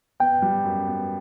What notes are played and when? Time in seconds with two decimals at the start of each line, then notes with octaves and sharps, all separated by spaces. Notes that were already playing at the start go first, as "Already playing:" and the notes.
0.20 B3 G5
0.42 G3
0.64 F#2
0.86 B3